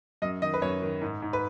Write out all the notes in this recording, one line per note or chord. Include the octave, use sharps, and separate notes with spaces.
F#2 D#5
D#3 D#5
B4
F#2 C#5
D#3
G#2
G#2
B4